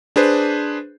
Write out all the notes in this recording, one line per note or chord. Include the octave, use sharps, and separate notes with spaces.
D4 G#4 B4 C5